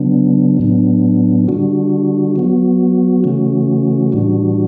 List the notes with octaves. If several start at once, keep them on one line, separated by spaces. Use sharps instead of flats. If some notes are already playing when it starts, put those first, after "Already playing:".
Already playing: C#3 F#3 B3 D4
A2 F#3 B3 D4
D3 G3 D4 F#4
F#3 B3 F#4
C#3 E3 A3 C#4 F#4
A2 E3 G3 D4 F#4